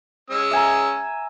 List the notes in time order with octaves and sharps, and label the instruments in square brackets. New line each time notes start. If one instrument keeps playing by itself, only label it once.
[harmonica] G#3 C#4 E6
[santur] E5 G#5 A#5